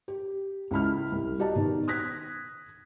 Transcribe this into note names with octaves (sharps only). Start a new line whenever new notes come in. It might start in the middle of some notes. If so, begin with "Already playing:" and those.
G4
C#2 E4 B5 F6
C2
F#4 G4 D5 D#5 A5 A#5
B2 D#3
D#6 F#6 G#6 A#6 B6